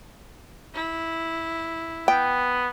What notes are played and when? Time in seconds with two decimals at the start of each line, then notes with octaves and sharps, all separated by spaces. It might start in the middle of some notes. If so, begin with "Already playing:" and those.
0.74 E4
2.08 B3 G5